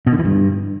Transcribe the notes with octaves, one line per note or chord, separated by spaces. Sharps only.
B2
D3
E3
G2